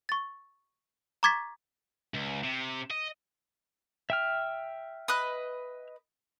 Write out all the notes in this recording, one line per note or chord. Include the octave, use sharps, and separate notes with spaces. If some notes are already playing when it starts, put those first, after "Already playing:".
C#6 A6
A#5 C#6 D6 G#6 A6 B6
C#2
C3
D#5
E5 G5 F6
B4 D#5 F#6